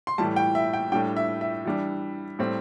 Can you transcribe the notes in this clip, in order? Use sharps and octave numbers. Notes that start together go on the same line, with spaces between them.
C6
A2 E3 G3 A5
G5
E5
G5
A2 G3 D4 G5
E5
E5
E3 G3 D4
A2 G3 C4